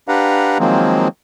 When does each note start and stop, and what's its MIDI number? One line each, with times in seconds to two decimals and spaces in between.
0.08 0.58 62
0.08 0.58 67
0.08 0.58 71
0.08 0.58 77
0.08 0.58 78
0.08 0.58 82
0.59 1.08 51
0.59 1.08 53
0.59 1.08 54
0.59 1.08 56
0.59 1.08 58
0.59 1.08 60